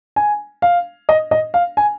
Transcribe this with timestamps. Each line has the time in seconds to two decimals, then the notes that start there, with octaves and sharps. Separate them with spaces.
0.16 G#5
0.62 F5
1.09 D#5
1.31 D#5
1.54 F5
1.77 G#5